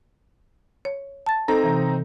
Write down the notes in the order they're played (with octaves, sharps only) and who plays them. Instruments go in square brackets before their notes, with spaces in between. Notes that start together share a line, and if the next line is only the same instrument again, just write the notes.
[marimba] C#5
A5 A6
[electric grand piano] C4 D#4 A#5 [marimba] A4
[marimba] C3 E3